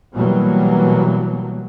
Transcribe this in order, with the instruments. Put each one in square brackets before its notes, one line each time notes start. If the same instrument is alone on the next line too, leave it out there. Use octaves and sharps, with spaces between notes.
[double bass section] B2 E3 F#3 G3 A#3